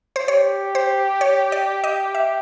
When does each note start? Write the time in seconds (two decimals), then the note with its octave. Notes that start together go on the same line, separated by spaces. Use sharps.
0.16 C5
0.28 G4 C#5
0.75 C5
1.21 C#5
1.52 D5
1.84 D#5
2.15 E5